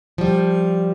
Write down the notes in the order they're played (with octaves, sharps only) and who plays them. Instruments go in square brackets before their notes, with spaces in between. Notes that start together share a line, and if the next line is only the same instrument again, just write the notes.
[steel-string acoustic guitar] F3 G3